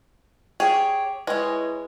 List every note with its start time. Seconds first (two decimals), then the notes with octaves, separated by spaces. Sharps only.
0.60 G4 G#4 C#5
1.27 G#3 E4 B4 C#5 D#5 G#5